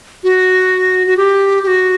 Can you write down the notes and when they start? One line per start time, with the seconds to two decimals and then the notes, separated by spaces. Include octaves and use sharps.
0.24 F#4
1.07 F#4
1.17 G4
1.63 G4
1.67 F#4